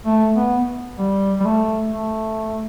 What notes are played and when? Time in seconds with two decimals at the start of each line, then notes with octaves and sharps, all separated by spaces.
0.06 A3
0.36 B3
0.99 G3
1.40 G3
1.45 A3
1.92 A3